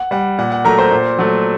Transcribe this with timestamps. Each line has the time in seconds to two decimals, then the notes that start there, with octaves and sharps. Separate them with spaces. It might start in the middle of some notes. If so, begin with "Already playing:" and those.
Already playing: F#5
0.11 G3 F#5
0.38 A#2 F#5
0.52 F#5
0.64 F#3 A3 A#4 A#5
0.78 C5 C6
0.91 A#2
1.19 F#3 A3